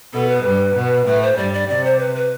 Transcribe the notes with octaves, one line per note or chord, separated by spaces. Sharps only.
B2 B3 A4
B4
G2 G3
B2 B3
A2 A3 B4
C5
G2 G3 D5
D5
C3 D5
C5
B4
B4